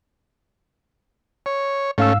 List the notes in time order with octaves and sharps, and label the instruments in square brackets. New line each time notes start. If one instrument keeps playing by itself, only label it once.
[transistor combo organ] C#5
[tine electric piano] G#2 F5 E6 [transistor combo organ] A3 C#4